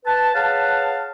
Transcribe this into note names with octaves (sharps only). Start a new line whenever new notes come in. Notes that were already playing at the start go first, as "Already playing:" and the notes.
B4 A5
G#4 B4 C#5 F5 F#5 A5